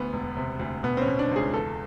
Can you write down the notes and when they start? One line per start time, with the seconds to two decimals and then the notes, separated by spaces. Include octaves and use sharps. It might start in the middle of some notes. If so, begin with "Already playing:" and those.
Already playing: D2 B3
0.13 E1
0.37 C3
0.59 D2
0.83 B2 B3
0.97 C4
1.01 C#4
1.07 B2
1.19 D4
1.31 C#2 G#4
1.53 E2 A4